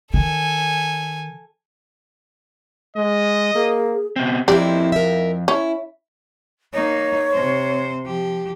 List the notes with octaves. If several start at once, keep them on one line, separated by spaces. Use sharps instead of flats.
D#3 A4 G#5
G#3 D#5
A#3 G#4
B2 C4
F2 A#3 C4 E4 G4 D5
A#4 E5
C#4 E4
A#3 D#4 C#5
C3 C5
F3 G4